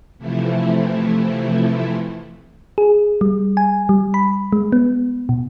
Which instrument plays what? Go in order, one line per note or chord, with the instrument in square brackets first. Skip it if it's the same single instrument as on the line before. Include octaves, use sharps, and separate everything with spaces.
[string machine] C3 E3 F3 A3 E4
[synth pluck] G#4
G3
G#5
G3
B5
G#3
B3
B2